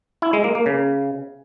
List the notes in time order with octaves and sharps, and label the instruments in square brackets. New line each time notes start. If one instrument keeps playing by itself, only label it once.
[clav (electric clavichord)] E4
G#3
A#3
A#3
C#3